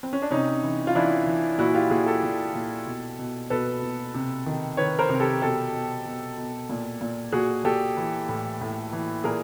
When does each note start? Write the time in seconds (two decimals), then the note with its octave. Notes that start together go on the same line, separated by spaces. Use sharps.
0.03 C4
0.13 C#4
0.22 D4
0.31 C3 C#4 D#4
0.63 E3
0.87 F4
0.95 E3 D4 E4
1.26 E3
1.58 A#2 E4 F#4
1.74 F4 G4
1.90 A#2 F#4 G#4
2.06 G4 A4
2.23 A#2
2.55 A#2
2.86 B2
3.19 B2
3.50 B2 A4 B4
3.83 B2
4.14 C3
4.46 D#3
4.77 D#3 B4 C#5
4.99 A#4 C5
5.09 C3
5.20 G4 A4
5.42 B2 G4 A4
5.74 B2
6.06 B2
6.38 B2
6.69 A#2
7.01 A#2
7.32 A#2 F#4 G#4
7.64 A#2 G4 A4
7.97 E3
8.29 A2
8.61 A2
8.92 E3
9.24 A#2 G#4 A#4